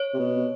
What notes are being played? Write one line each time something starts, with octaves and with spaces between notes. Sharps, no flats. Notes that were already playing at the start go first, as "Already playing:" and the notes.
Already playing: C#5
C3
B2